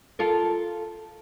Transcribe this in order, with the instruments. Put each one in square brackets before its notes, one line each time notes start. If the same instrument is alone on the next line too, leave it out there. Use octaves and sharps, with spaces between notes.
[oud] F4 A4 A#4